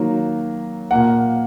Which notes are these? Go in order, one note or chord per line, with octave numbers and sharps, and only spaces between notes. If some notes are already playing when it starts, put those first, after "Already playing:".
Already playing: D#3 F#3 A#3
A#2 A#3 F#5